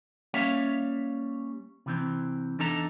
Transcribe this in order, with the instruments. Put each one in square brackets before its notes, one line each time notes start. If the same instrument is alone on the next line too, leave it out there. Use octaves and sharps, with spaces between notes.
[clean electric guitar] G3 A#3 C#4 C#5 E5 F5
C3 E3 C4
E2 D4 D#4 A4 A5 A#5